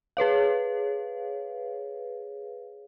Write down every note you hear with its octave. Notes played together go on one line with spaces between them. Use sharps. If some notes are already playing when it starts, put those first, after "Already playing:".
G#4 B4 C#5 F5